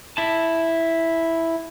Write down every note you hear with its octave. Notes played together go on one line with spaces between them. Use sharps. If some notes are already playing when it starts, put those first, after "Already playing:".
E4 A5